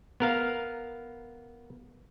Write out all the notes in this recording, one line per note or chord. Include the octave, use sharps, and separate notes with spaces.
B3 A#4 F5